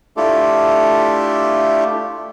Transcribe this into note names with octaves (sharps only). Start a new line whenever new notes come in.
A3 D4 E4 F4 G4 A4